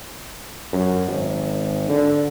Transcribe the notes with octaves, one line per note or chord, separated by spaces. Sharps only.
F#2
G#1
D3